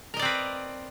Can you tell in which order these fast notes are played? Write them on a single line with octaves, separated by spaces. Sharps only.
A#4 D#5 D5 C4 B4